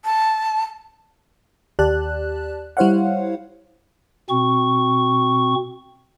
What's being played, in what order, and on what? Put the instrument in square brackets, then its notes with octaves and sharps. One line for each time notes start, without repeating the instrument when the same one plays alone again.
[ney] A5
[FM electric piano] D#2 G4 D5 A5 F#6
G3 E4 C5 C#5 F5 F#5
[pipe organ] B2 C4 C#6